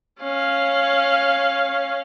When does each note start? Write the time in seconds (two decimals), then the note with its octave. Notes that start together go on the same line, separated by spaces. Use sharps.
0.20 C#4 F5